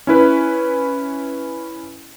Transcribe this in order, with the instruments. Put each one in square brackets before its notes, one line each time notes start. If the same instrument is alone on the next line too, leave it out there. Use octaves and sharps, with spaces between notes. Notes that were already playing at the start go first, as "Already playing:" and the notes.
[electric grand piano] C#4 E4 B4